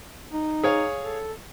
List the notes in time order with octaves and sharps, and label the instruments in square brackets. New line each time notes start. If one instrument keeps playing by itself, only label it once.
[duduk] D#4
[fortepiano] G#4 C#5 F5
[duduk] A4